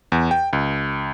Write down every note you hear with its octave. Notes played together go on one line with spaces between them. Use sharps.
E2
G5
C#2